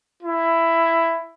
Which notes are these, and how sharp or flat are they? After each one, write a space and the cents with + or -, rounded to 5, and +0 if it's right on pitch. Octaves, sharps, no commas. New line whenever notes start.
E4 +10